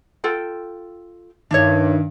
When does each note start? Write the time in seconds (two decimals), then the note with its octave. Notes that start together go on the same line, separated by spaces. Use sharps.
0.24 F4 A4 G5
1.51 G2 D#3 D4 E4 C#5